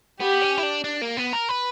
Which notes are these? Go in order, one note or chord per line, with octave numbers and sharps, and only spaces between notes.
B3 G4
C#4
E4
D4
D4
A#3
B3
A#4
B4